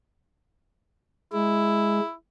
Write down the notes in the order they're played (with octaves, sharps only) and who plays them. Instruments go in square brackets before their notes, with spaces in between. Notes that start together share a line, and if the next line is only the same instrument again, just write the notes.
[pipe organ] G#3 [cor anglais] E4